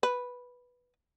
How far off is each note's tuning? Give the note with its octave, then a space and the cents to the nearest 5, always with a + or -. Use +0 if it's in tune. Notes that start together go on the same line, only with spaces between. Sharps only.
B4 -5